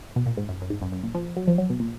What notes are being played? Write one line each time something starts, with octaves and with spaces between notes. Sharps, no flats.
B2
A#2
G#2
F#2
F#2
G#2
F#2
F#2
A#2
F3
F#3
F3
F#3
B2
A#2